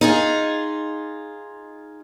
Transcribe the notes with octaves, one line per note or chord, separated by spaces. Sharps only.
D#4 F4 G#4